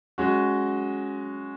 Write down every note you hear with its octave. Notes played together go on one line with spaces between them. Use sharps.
G#3 C#4 F#4